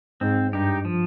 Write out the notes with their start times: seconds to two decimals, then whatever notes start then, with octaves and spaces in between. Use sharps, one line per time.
0.21 G#2 C4
0.53 G2 D#4 G4
0.85 F3